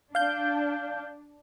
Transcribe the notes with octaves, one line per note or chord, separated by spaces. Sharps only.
D4 F5 G6